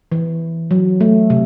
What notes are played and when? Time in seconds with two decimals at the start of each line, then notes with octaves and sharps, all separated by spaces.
0.12 E3
0.71 F#3
1.01 A3
1.30 C3